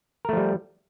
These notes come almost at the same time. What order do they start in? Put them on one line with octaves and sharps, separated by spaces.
A#4 A3 F3 G3